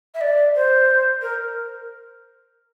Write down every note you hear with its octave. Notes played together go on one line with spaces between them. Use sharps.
E5
D5
C5
A#4